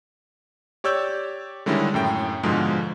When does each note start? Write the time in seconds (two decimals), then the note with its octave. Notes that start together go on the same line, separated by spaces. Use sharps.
0.84 G4 C#5 D5 E6 G6
1.66 D3 D#3 G3 G#3 C#4 E4
1.94 F#2 A2 G5
2.43 G#2 B2 D3 F3 G#3